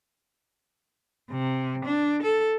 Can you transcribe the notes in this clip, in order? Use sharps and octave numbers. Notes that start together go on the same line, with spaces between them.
C3
D4
A4